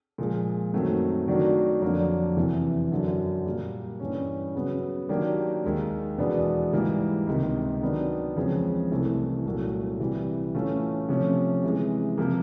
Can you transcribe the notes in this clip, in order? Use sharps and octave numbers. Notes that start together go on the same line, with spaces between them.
A#2 F3 G#3
F#2 D#3 F#3 A3 C4
D#3 F#3 A3 D4 F#4
F2 D3 F#3 A#3 D4
E2 C3 E3
F#2 D3 F#3
A#2 G3 A#3
G2 E3 G3 A#3 C#4
C#3 F#3 B3
D#3 F#3 A#3 D4 G4
D#2 D#3 G#3
E2 B2 G#3 B3 D4
G#2 E3 G3 A#3
C#2 C3 D#3
D#3 F#3 B3 D4
E2 C#3 F3 G#3 C4
C2 C3 E3 A3
C2 A#2 F#3 A3
C3 E3 G3
A2 E3 A3 C#4 F4
C3 F3 A3 C#4
C3 E3 G#3
C3 F3 A#3